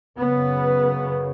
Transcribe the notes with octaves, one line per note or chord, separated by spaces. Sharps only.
F#2 C#3 B3